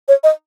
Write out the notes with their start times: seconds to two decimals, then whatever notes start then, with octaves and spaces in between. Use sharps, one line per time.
0.08 C#5
0.24 D#5